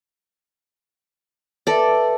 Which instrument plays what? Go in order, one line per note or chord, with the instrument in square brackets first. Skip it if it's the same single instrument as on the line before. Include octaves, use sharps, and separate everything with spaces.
[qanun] A4 D5 [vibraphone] B4 E5